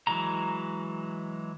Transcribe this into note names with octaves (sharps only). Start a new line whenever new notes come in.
E3 F#3 G#3 A#5